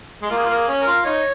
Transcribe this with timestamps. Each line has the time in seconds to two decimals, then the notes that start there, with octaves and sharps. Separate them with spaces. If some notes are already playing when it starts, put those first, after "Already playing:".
0.22 G#3
0.30 A#3 F4
0.37 G#4
0.44 F4
0.49 A#3
0.55 G#4
0.68 C#4
0.81 A#4
0.87 F4
1.05 D#4 C#5